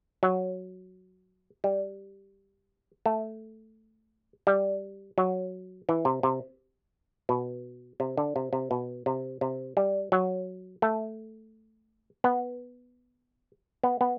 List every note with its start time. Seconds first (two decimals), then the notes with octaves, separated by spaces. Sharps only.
0.23 F#3
1.64 G3
3.06 A3
4.47 G3
5.18 F#3
5.89 E3
6.05 C3
6.23 C3
7.29 B2
8.00 C3
8.17 D3
8.36 C3
8.53 C3
8.71 B2
9.06 C3
9.41 C3
9.77 G3
10.12 F#3
10.82 A3
12.24 B3
13.84 B3
14.01 B3